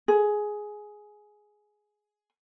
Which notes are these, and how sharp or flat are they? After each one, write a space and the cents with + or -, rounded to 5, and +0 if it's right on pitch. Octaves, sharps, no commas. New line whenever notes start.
G#4 +10